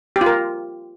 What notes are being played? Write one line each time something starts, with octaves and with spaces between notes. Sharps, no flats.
G4
F4
A#4